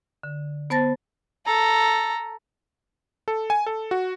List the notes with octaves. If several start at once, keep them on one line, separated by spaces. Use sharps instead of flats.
D3
B3 C5 A5 A6 A#6
A4 A#5
A4
G#5
A4
F#4